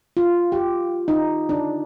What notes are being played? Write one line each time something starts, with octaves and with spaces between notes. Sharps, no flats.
F4
G4
D#4
D4